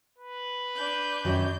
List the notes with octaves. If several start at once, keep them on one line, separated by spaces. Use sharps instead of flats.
B4
D4 G6
F#2 D#3 F#3